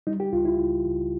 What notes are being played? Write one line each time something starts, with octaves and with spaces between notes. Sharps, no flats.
G3 D#4
G4
C#2 F4
E4
C#2
C#2